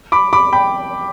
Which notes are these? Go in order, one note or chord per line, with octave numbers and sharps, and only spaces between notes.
B5 D6
B5 D6
G5 B5